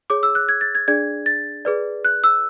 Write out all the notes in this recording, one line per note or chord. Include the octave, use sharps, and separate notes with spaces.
G#4 C#5 D6
E6
F#6
G#6
A6
G#6
D4 G#4 D5 G#6
A6
G#4 B4 D5
F#6
E6